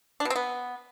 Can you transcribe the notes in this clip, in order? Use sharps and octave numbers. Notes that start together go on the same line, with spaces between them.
D4
B2
C4
B3